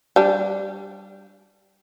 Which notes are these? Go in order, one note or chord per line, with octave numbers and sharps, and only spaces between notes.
G3 D4